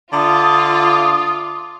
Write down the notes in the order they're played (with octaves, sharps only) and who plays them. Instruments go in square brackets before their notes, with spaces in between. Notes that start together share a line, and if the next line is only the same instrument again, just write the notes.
[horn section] D3 E5 A5 [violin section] F4 [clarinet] D6 [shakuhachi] D#6